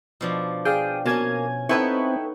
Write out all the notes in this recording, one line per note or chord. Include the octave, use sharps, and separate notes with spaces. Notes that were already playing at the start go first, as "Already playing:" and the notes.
B2 F3 D4
G#4 D5 F5 G5
B2 A#3 C#4 G#5 A5 G#6
B3 C4 D#4 E4 A4 B4 G5 C#6